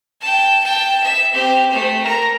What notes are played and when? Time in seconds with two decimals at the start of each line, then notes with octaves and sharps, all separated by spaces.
0.21 G5 A5
0.63 G5 A5
1.03 E5
1.33 C4 G4
1.71 A3 C5
2.03 A#4 A#5